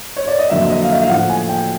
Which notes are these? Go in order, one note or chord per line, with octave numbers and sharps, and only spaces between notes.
C#5
D5
D#5
F2 D3 F#3 A#3 E5
D#5
F5
E5
F5
A2 F3 A3 F#5
G#5
G5